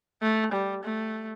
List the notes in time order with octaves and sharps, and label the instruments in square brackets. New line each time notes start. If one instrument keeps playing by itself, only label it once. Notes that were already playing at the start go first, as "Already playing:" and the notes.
[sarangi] A3
G3
A3